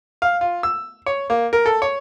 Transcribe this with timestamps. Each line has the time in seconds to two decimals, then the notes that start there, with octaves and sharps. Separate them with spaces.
0.22 F5
0.41 F4
0.63 E6
1.06 C#5
1.30 A#3
1.53 A#4
1.66 A4
1.82 C#5